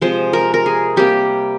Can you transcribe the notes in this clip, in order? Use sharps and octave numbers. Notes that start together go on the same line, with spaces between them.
C3 F3 G#3 C5
A#4
A#4
G#4
C3 G3 A#3 G4